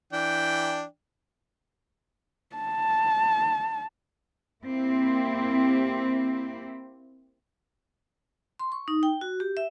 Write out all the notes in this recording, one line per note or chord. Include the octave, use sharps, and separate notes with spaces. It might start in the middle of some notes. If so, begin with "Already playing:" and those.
E3 D4 G5
A5
A#3 C4 E4 G4
C6
C#6
D#4
G5
F#4
G4
E5